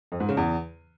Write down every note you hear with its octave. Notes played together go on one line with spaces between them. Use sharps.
F2
G#2
C#3
E2